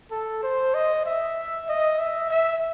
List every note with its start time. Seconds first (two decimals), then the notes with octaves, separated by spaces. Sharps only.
0.11 A4
0.43 C5
0.74 D#5
1.06 E5
1.69 D#5
1.99 E5
2.31 E5